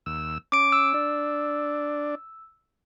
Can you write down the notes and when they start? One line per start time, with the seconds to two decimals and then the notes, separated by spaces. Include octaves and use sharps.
0.06 D#2 E6
0.52 C#4 D6 D7
0.72 E6
0.94 D4 D5